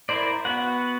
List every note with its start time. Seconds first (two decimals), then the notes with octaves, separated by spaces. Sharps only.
0.09 E4 A#4 C5 D5
0.45 B3 F#4 F#5